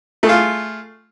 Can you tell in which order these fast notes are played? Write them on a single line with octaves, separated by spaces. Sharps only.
A3 G#4 F4